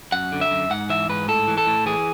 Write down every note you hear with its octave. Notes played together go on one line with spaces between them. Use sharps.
F#2 F#5
D3
E5
F#2
G#2 F#5
E3 E5
G#2 B4
A2 A4
E3
A4
A2
E3 G#4